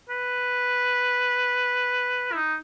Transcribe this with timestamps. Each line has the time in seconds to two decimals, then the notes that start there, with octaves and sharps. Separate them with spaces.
0.09 B4
2.32 E4
2.35 D#4